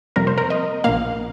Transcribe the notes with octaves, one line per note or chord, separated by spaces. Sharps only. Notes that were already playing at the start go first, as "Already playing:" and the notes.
F2 C3 G3 A#3 A#4
C5
A#4
D#5
A#1 A#2 A#3 F5